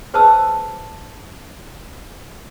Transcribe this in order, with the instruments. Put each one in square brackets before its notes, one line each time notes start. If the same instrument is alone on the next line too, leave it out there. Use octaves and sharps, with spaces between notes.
[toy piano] G#4 B4 C5 A5 D#6 E6